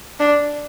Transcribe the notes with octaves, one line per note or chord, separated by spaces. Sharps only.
D4